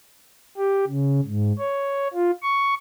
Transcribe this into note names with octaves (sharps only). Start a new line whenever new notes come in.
G4
C#3
G#2
C#5
F4
C#6